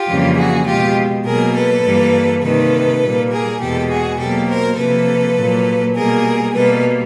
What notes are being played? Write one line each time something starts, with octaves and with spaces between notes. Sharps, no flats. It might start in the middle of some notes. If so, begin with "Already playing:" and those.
Already playing: F4 G4
F2 C#3 E3 G3 A#3
F#4 G#4
G#3 F4 G4
B2
B2 F#3 A#3 G#4 A#4
A4 B4
G2 E3 G3 A#3
C3 D#3 G3 A#3 A4 B4
A#2 G3 A#3
G#4 A#4
E2 B2 G#3 G4 A4
F#4 G#4
B2 F#3 A#3 G4 A4
A#4 C5
C3 F3 A#3 A4 B4
A#2 F#3 A#3
B2 G3 A#3 G#4 A#4
B2 G3 A#3 A4 B4